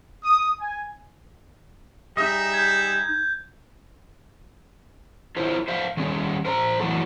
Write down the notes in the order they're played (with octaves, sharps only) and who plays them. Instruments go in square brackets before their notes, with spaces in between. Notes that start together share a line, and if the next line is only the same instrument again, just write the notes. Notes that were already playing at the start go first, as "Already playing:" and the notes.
[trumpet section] D#6
G#5
[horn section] G3 G#4 E5 [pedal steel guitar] D#4 D#5
[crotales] G6 G#6
[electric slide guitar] E4 F4 A#4 C5 C#5
C5 E5 F5
D#3 G3 C#4
A#4 C5 A5 A#5
F#2 E3 F#3 A3 F#4 A4